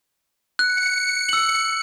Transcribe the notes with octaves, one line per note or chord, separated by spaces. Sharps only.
F#6 C#7
E6 F#7